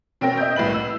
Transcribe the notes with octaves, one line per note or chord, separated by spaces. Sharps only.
B2 C4 C#4 A#4 G5 A#6
D#5 E5 G6
C2 A2 B4 F#7
E6